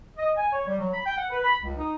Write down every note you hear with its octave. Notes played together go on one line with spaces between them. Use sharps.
D#5
G#5
C#5
G3
F#3
B5
G5
F#5
B4
B5
C#2
D#4